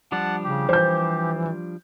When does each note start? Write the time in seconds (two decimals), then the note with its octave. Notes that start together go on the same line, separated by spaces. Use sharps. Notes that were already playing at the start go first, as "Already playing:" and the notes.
0.12 F3 G3 D4 F#5 A5
0.44 C#3 G4
0.69 E3 C5 G6